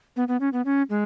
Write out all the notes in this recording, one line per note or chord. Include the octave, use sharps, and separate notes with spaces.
B3
B3
C#4
B3
C#4
G#3